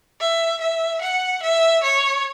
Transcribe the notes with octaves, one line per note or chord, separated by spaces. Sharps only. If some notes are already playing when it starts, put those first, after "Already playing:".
E5
E5
F#5
E5
C#5